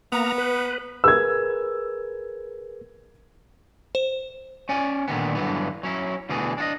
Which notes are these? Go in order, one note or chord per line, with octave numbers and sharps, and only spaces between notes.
A#3 B3 A#5
B4
G#4 A#4 B4 E6 G#6
C5
C#4 D5 G#5
A#2 D3 D#3 B3
G2 A#2 D3 E3 F#3 B3
F#3 C#4 E4
D2 B2 E3 D4 G#4
D4 F#4 D#5